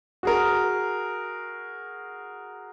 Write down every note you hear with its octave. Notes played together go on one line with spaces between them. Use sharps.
F#4 G#4 A#4